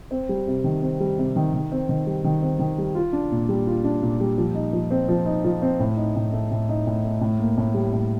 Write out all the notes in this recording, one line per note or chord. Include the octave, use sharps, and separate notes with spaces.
C4
G3
C3
D#3
C4
G3
C3
D#3
D#3
C4
D#3
G3
D#3
C4
D#3
G3
F4
D4
A#2
G3
F4
D4
A#2
G3
F3
D#4
F3
C4
F3
D#4
F3
C4
A2
D#4
A2
A3
A2
D#4
A2
A3
A2
A#3
A2
G3
A2